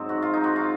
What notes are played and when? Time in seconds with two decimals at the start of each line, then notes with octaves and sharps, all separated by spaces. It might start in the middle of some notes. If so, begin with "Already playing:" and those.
Already playing: G#2 F#3 C4
0.09 F#4
0.22 F4
0.34 D#4
0.44 F#4
0.56 F4